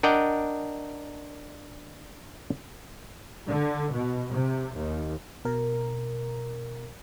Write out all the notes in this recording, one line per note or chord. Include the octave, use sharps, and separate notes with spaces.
D4 A#4 D5 D#5 F#5 G5
D3
B2
C3
D#2
B2 A#4